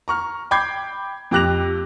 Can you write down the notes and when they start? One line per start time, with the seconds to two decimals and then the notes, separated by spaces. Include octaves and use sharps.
0.08 A#5 C#6 F6
0.51 G5 B5 D6 G6 G#6 C7
1.31 F2 G4 D6 F#6 A#6 F7